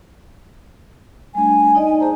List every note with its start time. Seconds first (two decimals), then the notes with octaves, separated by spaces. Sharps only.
1.35 G3 A3 D4 G#5
1.75 D#4 D5 D#5
2.00 G#4 C5 A5 A#5